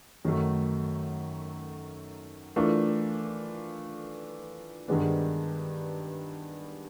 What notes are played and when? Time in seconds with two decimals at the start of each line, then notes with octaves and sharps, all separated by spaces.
0.25 F#2 D#3 F#3 A3
2.56 E3 A3 D4 F4 A#4
4.88 G2 D#3 G#3 B3 D4